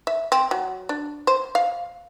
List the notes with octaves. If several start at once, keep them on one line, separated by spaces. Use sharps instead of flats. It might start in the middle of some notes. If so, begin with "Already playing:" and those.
E5
C4
F#3
D4
C5
F5